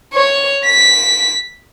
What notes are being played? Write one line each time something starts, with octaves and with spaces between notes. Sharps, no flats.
C#5
B6